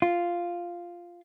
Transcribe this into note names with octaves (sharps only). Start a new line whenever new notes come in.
F4